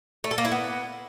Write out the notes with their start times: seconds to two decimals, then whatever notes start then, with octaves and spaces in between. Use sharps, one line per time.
0.24 A3
0.31 A4
0.38 A#3
0.45 E4
0.52 B3